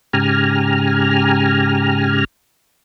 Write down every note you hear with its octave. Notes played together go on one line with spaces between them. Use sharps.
G#2 C#3 G4 G#5 A#5 F6